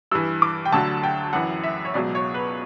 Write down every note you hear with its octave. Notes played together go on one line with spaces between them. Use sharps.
G2 E3 E6
D6
G5
D2 D3 F#3 A5
G5
F#2 E3 F#5
E5
C#5
C#2 B2 F#3 D5
C#5
B4